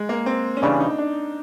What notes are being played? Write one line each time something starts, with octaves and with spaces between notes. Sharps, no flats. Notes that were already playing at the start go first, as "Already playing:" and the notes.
Already playing: G#3
A#3
C4
C#4
C#3 E3 G3 D4
D#4
D4